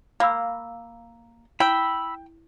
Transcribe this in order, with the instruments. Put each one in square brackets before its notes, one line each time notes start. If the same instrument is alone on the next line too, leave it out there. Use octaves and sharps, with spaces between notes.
[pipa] A#3 [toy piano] F5 B5 E6
[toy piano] E4 [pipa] G5 [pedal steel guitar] B5 E6